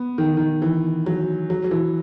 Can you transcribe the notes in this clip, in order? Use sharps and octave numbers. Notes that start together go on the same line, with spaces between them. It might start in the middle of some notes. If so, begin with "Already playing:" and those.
Already playing: B3
D#3
D#3
E3
F#3
F#3
F#3
E3